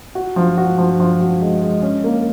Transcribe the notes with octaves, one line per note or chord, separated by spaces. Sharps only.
F#4
F3
F#4
F3
F3
F#4
G#3
G#3
C#4
A#3